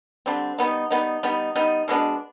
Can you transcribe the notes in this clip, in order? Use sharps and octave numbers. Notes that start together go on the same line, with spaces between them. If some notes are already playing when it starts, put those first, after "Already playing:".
D3 G3 C4
G3 B3 D#4
G3 B3 D#4
G3 B3 D#4
G3 B3 D#4
B2 G#3 B3 D4